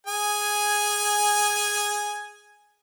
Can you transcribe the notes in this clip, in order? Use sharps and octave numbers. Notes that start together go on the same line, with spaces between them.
G#4 G#5